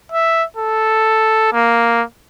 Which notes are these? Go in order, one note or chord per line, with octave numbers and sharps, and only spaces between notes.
E5
A4
A#3